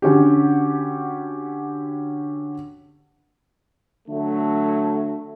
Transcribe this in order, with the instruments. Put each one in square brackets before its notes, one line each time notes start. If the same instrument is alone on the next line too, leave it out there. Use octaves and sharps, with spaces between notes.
[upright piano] D3 C#4 F#4 G4
[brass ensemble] D3 F#3 A3